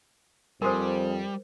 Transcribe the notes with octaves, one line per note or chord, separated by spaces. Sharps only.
F2 G3 A#4 C5 G#5 C6 D#6